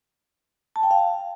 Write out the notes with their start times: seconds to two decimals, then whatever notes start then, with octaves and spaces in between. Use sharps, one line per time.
0.76 A5
0.83 G5
0.91 F5